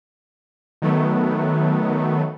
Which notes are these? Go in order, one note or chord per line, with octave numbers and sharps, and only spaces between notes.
D#3 F#3 A3 B3